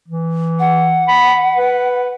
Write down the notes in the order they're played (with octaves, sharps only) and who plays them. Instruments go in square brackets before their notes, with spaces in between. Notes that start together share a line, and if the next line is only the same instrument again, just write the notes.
[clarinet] E3
[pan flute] F#5
[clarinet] B5
B4